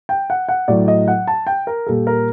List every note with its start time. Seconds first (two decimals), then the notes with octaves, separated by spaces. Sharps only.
0.09 G5
0.30 F#5
0.49 F#5
0.68 A2 F#3 D5
0.88 D#5
1.08 F#5
1.27 A5
1.47 G5
1.67 A#4
1.86 A#2 G3 A4
2.07 A#4